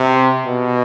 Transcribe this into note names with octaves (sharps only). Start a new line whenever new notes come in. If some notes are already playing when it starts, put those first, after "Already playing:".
Already playing: C3
B2